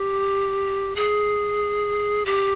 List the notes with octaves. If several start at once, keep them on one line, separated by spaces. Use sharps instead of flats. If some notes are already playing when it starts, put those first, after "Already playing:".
Already playing: G4
G#4
G4